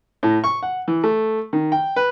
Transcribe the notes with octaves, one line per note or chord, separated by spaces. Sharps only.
A2
C#6
F#5
E3
A3
D#3
G5
B4